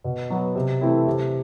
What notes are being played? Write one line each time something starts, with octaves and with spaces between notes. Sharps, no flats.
B2
F#3 B3
C3
E3 A3 C4 E4
C3